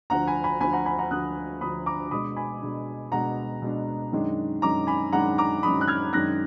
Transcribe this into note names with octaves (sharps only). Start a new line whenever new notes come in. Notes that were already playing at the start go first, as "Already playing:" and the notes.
D2 D3 F3 F#5 A#5
G#5 B5
G#5 B5
D2 D3 F3 G#5 B5
F#5 A#5
G#5 B5
F#5 A#5
D2 D3 F3 D#6 F#6
D2 D3 F3 B5 D#6
A#5 D6
B2 G#3 D4 B5 D#6
G#5 B5
B2 G#3 D4
B2 G#3 D4 F#5 A#5
B2 G#3 D4
F#2 D#3 G#3 D4
F#2 D#3 G#3 D4 A#5 D6
G#5 B5
F#2 D#3 G#3 D4 F#5 A#5
A#5 D6
F#2 D#3 G#3 D4 B5 D#6
F#6
F6 G#6
F#2 D#3 G#3 D4 F#6 A#6